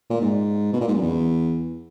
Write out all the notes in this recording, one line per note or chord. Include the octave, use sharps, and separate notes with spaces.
A#2
G#2
B2
A#2
G#2
F#2
E2